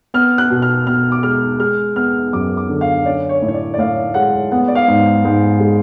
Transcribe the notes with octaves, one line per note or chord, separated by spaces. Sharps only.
B3 F6
F#6
B2
F6
B2 F6
D6
G#3 F6
G#3 F6
B3 F6
F#2 D6
D6
D3
F5
C#4 D5
C#5
A2
C#5
D5
D5
A2 F5
G#3 F#5
B3 F#5
D5
F5
G#2
G#2
G#3